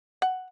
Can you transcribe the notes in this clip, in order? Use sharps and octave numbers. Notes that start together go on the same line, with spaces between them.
F#5